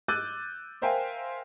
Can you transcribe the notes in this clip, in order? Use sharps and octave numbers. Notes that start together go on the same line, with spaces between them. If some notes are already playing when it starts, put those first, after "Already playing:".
D6 E6 F#6 G6 A6 D#7
A#4 C5 E5 F5 G5 G#5